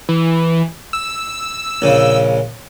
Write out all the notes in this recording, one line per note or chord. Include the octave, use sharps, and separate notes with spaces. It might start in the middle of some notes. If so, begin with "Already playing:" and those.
E3
E6
A#1 C#3